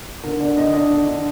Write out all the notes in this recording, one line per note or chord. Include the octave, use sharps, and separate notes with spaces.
D3 A#4
D3 D5
D3 D#5
D4 D#5
D3
D3